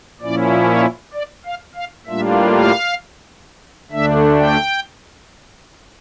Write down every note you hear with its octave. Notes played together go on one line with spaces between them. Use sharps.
A#2 F3 C#4 E4 D5
C#5
D5
F5
F5
A2 G3 A#3 D4 F4 E5
F5
D2 D3 A3 D4 E5
G5